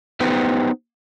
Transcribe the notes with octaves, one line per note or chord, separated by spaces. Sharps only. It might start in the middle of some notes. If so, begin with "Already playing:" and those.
B3 D#4 G4 B4 C5